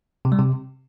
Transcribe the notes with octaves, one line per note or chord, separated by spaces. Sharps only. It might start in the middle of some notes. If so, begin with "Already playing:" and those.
C3
G3
C3